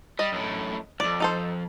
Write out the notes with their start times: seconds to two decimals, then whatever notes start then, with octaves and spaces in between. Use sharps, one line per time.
0.19 G3 D#5
0.32 F#2 A2
1.00 C2 F2 D5
1.20 D#4 A4 C5